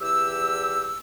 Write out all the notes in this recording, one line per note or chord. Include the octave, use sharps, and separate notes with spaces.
E2 G4 E6